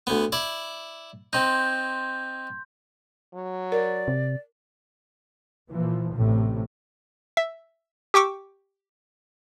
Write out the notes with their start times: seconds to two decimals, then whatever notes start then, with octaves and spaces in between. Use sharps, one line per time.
0.07 D2 B3
0.32 E4 D5
1.33 C4 D#4 C6 G6
3.35 F#3
3.72 A#4 D5
4.08 C3
5.71 A#2 E3 F3
6.16 A1 A2 C3
7.37 E5
8.14 G4 G5 C#6 D6 E6